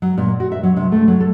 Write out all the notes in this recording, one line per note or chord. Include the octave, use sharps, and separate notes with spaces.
F#3
A#2
F#4
E5
F#3
C3
A3
F#3
A4